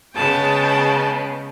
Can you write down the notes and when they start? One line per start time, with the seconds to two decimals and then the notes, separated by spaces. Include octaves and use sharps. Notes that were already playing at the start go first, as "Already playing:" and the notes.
0.15 C#3 G#3 B3 G5 A5